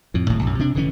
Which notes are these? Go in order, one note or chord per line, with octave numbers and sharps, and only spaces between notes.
F2 A2
D1 G#1 A2
B1 F#2
C3 D4
F1 D3 E3 C#4